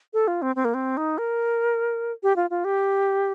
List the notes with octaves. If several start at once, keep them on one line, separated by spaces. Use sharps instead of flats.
A4
F4
C4
C4
A#3
C4
D#4
A#4
G4
F4
F4
G4